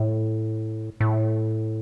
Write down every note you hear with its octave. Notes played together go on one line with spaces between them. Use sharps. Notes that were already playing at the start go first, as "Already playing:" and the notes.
Already playing: A2
A2